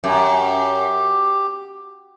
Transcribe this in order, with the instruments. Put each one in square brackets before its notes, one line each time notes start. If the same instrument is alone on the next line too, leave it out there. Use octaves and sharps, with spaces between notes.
[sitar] F#2 [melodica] G4